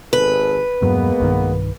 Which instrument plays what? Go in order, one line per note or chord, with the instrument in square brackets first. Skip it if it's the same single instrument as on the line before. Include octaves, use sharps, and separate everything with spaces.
[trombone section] G#1 G#4 A4 [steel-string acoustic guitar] B4
[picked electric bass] E1 G2 F#3 [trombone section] G#3 A#3 B3
[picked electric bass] B1 G2 D#3